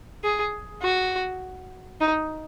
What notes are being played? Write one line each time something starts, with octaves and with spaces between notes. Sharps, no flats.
G#4
F#4
D#4